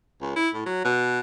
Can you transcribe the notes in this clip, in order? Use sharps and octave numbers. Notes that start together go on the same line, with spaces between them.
C#2
E4
A2
F#3
B2